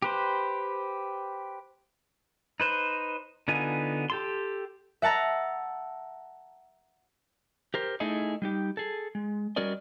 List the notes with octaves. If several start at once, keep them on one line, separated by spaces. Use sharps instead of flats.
G4 B4 C5
D#4 B4 C5
D3 B3 D#4 F4 G#5
G4 A4 C6
E5 F#5 A5 A#5
G4 A#4 C5
A3 D#4 E4 G#4 A4 D#5
G3 D#4 G4
G#4 A4
G#3
G3 C#4 F#4 A#4 D5 D#5